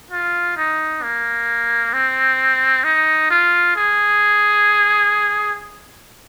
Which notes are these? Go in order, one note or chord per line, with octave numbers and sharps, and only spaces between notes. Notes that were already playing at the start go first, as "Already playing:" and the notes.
F4
D#4
A#3
C4
D#4
F4
G#4